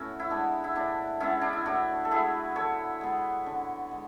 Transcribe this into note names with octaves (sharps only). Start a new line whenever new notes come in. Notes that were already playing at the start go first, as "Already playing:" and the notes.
Already playing: A2 B3 C#4 F#4
E4
G#3 B3 D4
E4
A2 D4
G#3 B3 C#4 E4
D4
E4
A2 D4 F#4
A4
G#3 B3 E4 G#4
D3 A4 C#5
G#3 B3
D3
G#3